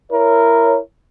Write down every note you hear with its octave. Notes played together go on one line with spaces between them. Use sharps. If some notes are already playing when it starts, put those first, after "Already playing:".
E4 A#4 C#5